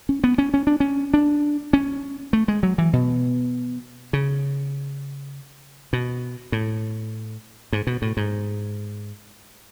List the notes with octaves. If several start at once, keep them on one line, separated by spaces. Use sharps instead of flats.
C#4
B3
C#4
C#4
D4
C#4
D4
C#4
A3
G#3
F#3
E3
B2
C#3
B2
A2
G#2
B2
A2
G#2